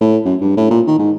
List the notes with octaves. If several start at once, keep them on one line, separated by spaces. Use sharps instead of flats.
A2
F#2
G2
A2
A#2
D#3
G#2